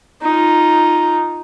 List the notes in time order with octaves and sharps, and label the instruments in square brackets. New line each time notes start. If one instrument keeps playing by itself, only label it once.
[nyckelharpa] D#4 F4